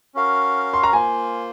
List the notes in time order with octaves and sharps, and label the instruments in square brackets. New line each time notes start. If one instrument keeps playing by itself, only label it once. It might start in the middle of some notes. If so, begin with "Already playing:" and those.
[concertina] C#4 F#4 A#4 F5
[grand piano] C6
A#5
[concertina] A#3 F4 C5 [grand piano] G#5